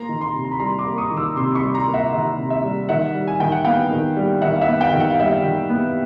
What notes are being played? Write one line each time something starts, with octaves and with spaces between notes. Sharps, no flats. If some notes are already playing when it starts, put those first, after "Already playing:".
Already playing: A#3 A#5 C6
D#3
A#5 C6
C3
A#5
B5
G3 A#5 C6
C6 D6
A#3
C#6 D#6
D#3
D6 E6
C3 C6 D6
B5 C#6
G3
A#5 C6
A#3
E5 F#5
D#3 E5
C3
E5
G3
D#3 E5 F#5
G3
G#5
D#3 G5
F#5
B3 F5 G5
D#3
G3
D#3 E5 F#5
F5
E5 F#5
B3
F5 G5
D#3
F#5
F5
G3 E5 F#5
D#3
B3